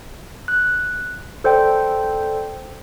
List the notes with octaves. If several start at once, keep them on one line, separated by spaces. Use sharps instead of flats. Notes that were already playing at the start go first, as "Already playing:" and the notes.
F#6
A4 C5 D5 G5